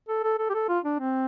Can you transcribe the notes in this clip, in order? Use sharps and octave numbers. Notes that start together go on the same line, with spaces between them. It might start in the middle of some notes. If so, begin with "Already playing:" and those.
A4
A4
A4
G4
A4
F4
D4
C4